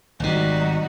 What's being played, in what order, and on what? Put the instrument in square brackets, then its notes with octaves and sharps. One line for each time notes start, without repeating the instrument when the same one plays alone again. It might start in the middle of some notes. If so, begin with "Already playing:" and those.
[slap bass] G#1 C3 [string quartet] G3 D#4 F#4